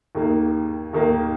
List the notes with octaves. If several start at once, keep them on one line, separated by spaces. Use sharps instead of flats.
D#2 D#3 A#3
D#2 D#3 A#3